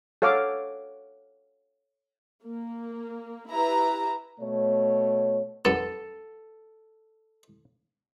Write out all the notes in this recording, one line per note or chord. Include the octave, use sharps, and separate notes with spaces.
A4 C#5 F5 F#5 D6
A#3
E4 G4 B4 E5 A#5
B2 A3 C#5
F#2 B3 A4